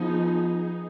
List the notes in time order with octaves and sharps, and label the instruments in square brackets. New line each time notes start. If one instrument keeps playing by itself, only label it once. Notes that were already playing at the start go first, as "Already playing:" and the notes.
Already playing: [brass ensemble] F3 [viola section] B3 D#4 G#4